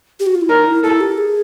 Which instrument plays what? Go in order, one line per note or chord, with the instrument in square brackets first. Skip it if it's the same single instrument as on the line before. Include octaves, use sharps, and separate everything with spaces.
[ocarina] G4
F#4
F4
E4
[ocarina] D#4 [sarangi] A#4
[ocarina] E4
[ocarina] E4 [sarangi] A4
[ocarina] G4
G#4